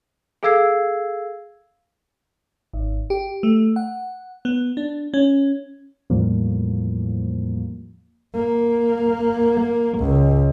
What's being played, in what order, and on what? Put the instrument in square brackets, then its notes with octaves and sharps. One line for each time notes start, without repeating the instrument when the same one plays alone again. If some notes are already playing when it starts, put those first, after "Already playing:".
[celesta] G#4 A4 F5 E6 G#6 C7
[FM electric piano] G#1
G4
A3
F#5
B3
D4
C#4
[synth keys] E2 A2 F3 G3 A#3
[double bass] A#3
C#2